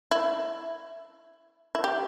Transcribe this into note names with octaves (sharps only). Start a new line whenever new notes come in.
E4
E4
G4